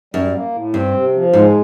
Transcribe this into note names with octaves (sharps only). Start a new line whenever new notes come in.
F#2 G3
A#3
A2
G2 C4
C3
F3
G#2 G#3